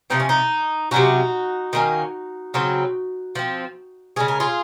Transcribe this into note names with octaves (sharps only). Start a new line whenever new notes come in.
C3 F3 C4 D#4
C#4
D#4
C3 F#3 C#4 D#4 F#4
D#3 A#3 C#4
C#3 F#3 C4
F3 C4
C#3 G#3 C#4 G#4
A#4
F4 G#4